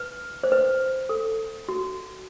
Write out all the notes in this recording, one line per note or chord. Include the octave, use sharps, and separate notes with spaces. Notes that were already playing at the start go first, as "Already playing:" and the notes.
Already playing: B4
C5
B4
A4
F#4